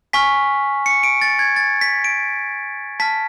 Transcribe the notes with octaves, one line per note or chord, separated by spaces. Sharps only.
G#5 C#6 F6 B6
C#7
D7
A6
G#6
A6
B6
D7
A5 F6 B6